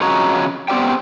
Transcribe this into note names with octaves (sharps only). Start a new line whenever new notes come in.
F2 C#3 F#4 C#5 D#5 A#5
B3 C4 G4 D5 G5